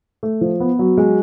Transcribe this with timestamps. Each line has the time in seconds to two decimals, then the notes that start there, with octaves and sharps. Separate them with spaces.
0.23 A3
0.41 F3
0.60 B3
0.79 F#3
0.97 G#3